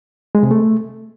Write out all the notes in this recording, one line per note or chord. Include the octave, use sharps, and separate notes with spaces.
G#3
C3
A3